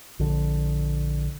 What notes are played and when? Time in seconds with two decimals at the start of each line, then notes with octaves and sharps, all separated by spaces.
0.19 A#1 D3